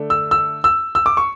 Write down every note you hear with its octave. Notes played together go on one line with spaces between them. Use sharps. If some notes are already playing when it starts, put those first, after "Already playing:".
Already playing: D3 A3 D4
E6
E6
E6
E6
D6
C#6